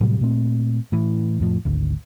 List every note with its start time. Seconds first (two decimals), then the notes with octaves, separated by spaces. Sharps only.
0.01 A2 C3 F#3 G3
0.21 A#2 A3 C4
0.92 A2 E3
1.40 F2 A2 F3
1.65 G#1 D2